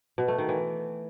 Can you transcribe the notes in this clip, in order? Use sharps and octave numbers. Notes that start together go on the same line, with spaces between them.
B2
A3
D#3
E3